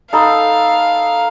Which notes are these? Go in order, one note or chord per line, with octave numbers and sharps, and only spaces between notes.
D#4 A4 F5 B5